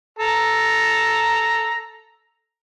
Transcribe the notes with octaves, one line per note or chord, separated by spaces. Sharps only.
A4 A#5